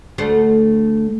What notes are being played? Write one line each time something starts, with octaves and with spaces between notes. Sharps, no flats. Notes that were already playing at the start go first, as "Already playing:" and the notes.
D2 A3 C5